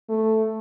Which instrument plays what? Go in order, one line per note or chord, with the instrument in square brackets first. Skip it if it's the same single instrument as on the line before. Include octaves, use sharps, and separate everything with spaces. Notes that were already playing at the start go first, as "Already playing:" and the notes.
[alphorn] A3